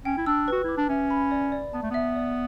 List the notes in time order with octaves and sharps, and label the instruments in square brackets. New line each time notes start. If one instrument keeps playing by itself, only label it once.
[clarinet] C#4 [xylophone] G5
[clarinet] E4
[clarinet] D4 [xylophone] E6
[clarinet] F#4 [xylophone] B4
[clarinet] E4 [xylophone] D6
[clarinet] D4
[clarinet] C#4 [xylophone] E5
[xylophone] B5
D5
D5
[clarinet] B3 [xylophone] A5
[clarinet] A3
[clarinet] B3 [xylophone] E5
[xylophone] D5